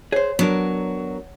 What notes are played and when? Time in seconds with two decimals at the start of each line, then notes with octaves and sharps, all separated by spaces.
0.12 G#4 C5 C#5
0.39 F#3 B3 D4 A#4